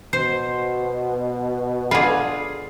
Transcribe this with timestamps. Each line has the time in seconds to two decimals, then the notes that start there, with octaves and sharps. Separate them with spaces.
0.13 B2 C5
1.91 D3 F4 G#4 B4